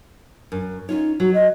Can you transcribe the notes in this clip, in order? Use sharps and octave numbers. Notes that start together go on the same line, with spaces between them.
F#2
C#4 D#4 F4 C#5
F#3 F#4
D#5